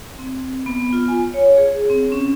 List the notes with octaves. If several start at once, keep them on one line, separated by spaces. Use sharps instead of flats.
C4
B3
F4
G#5
C#5
G#4
C4
C#4